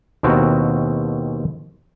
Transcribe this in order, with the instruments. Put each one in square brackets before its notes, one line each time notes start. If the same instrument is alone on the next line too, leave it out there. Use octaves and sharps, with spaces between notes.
[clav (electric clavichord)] D#2 B2 C4 E4 F#4 A#5